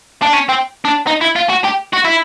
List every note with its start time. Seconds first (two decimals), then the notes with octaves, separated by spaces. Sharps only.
0.23 D4
0.33 C#4
0.49 C4
0.85 D4
1.07 D#4
1.21 E4
1.36 F4
1.50 F#4
1.65 G4
1.93 F#4
2.05 E4